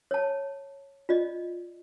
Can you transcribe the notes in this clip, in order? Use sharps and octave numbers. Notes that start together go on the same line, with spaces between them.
C#5 A5
F4 D5 D#5